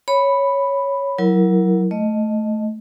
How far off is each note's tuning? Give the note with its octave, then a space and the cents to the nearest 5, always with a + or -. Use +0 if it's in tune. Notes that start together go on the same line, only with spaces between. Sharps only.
C#5 +0 B5 +0
F#3 +0 E4 +0 A#4 +0
A3 -10 D#5 +0